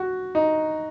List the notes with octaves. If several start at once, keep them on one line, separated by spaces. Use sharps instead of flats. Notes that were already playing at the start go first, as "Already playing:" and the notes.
Already playing: F#4
D#4